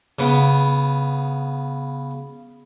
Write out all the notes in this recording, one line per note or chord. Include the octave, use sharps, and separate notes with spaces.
C#3 B3